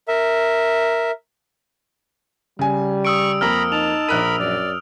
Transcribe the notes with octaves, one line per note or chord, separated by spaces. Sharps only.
A#4 E5
C#3 G3 G#5
C#6 D#6 E6 D7
F2 A#3 A#5 B5 F6
D#4 A5 F7
A#1 A#4 B5 F#6 D#7
F#2 D5